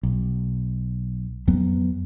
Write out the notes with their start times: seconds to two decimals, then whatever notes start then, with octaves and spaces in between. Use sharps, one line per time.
0.03 B1
1.47 F2 F#3 B3